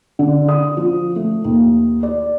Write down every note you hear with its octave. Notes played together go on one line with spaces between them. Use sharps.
D3
D#6
F3
A3
D#2
D5